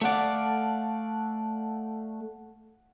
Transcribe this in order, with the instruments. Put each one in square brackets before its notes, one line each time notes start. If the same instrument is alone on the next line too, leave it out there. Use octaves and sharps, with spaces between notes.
[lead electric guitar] A3 D5 [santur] F5 F#5 A5